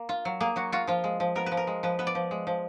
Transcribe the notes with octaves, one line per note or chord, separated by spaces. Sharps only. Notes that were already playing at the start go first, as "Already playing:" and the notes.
Already playing: A#3
F4
F#3
A#3 G#4
F#3 F#4
F4 F#4
F3 F4
G#3
F3
B3 A#4
B4
F3
A#4
G#3
F3 B4
B3 B4
D5
F3
G#3
F3